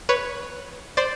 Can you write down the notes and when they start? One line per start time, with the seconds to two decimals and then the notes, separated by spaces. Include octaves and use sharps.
0.09 B4 C#5
0.97 C5 D5